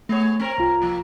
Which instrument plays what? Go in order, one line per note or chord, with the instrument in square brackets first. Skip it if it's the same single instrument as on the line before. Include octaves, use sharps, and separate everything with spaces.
[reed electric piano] A3 [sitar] B3 G#4 C#5
[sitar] C4 A#4
[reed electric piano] C2 F4
[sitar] F3 A#3